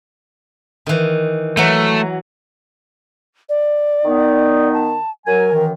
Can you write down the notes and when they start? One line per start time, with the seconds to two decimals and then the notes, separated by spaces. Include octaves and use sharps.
0.86 D#3 E3
1.57 E3 F#3 A3
3.49 D5
4.05 D#3 B3 D#4
4.73 A5
5.27 F#3 A#4 G#5
5.53 F#2 D#3 E3